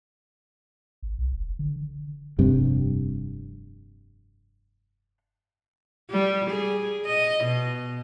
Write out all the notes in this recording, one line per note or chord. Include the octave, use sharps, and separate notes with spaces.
G#1
B1
E1
D3
F1 G2 C3 D4
G3
G#4
D#5
B2